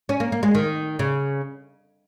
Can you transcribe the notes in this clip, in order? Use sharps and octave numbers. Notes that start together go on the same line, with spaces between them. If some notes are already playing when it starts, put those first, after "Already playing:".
C#4
A#3
A#3
G#3
D#3
C#3